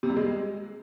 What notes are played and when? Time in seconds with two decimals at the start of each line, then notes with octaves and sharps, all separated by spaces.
0.03 C3
0.10 G3
0.16 G#3